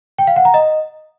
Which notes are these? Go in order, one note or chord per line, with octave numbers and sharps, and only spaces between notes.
G5
F5
F#5
A#5
D#5